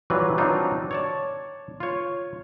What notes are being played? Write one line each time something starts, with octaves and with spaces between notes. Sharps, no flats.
E3 F#3 G3 F4 B4
F#3 G3 C4 D4 D#4 F4
C#5 D5 A5
F4 C#5